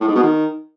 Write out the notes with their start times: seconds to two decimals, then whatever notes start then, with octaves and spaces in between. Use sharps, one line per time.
0.01 A2
0.08 G#2
0.16 B2
0.23 D#3